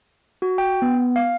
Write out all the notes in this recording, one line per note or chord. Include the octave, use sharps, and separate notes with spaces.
F#4
G5
B3
F5